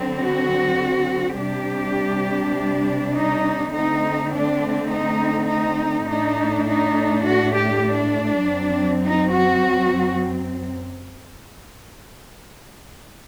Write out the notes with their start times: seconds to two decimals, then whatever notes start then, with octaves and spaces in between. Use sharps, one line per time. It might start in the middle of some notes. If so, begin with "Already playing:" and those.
Already playing: D3 F#3 C4
0.22 F#4
1.40 C3 G3 D4 G4
3.15 D#4
3.74 D3 A3 C4 D#4
4.32 D4
4.91 D#4
5.49 D#4
6.08 A2 A3 D4 D#4
6.67 D#4
7.26 F#4
7.55 G4
7.84 D4
8.43 F#2 F#3 C4
9.02 D#4
9.31 F#4